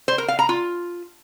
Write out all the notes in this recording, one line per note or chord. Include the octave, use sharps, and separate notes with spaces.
C5
A#4
F5
A#5
F4